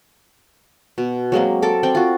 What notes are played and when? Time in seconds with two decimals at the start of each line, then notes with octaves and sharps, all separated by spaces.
0.98 B2
1.32 F#3 G#3 A#3 C4
1.62 A4 A#4 D6
1.83 C4 D5 G5
1.95 F4 F#4